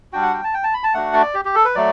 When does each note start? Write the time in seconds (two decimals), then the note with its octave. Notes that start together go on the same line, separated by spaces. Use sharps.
0.13 G3 D4 F#4 G5
0.22 F#5
0.34 G5
0.44 A5
0.54 G5
0.64 A5
0.74 B5
0.84 A5
0.94 A3 D4 F#4 F#5
1.14 D5
1.34 G4
1.45 G4
1.55 A4
1.65 B4
1.75 F#3 A3 D5